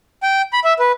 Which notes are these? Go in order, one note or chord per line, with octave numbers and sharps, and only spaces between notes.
G5
B5
E5
B4